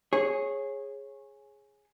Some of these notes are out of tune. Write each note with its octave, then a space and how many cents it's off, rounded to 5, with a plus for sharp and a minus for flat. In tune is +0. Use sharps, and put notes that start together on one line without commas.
G#4 +0 C#5 -20